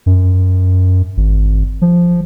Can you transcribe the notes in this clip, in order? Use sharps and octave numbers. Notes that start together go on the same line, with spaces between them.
F#2
G#1
F3